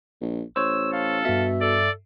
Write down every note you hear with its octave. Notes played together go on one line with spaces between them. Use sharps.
A#1
A1 C5 C#5 E6
A4 F5
G2 B2 E5
A4 D5